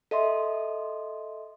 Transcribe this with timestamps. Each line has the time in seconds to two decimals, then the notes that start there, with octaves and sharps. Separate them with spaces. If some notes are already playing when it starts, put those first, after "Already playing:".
0.11 A4 D#5 E5 C6